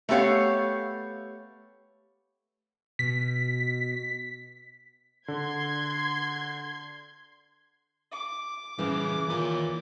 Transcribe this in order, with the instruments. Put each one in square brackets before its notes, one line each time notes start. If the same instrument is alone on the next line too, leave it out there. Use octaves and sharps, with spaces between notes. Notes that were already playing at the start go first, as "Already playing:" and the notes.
[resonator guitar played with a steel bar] A3 B3 G4 C#5 F5
[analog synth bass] B2 [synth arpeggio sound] B6
[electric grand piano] D3 [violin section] C6 G#6
[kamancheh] D6
[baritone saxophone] C#3 [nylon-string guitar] E3 [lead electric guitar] G3 C#4
[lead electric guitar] D#2 C#5 [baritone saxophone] A#2